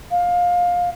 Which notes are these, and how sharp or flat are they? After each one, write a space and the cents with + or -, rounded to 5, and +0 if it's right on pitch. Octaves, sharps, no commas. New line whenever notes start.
F5 +20